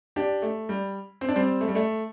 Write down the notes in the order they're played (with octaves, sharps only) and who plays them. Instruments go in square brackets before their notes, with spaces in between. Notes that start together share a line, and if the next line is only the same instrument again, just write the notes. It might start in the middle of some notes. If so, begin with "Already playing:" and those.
[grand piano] D4 G4
A3
G3
C4
D4
G3 C4
A3
G3
A3